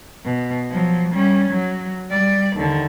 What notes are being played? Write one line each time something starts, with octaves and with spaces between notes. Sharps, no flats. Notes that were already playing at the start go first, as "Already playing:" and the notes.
B2
F3 F#3
G3 C#4
F#3
G3 D5
D#2 D3